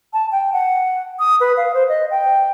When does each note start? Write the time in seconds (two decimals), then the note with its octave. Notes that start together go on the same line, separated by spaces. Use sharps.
0.13 A5
0.32 G5
0.53 F#5
1.19 D#6
1.41 B4
1.57 F5
1.74 C5
1.89 D#5
2.11 G5